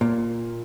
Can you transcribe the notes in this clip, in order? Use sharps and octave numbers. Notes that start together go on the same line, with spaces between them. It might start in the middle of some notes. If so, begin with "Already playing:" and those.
A#2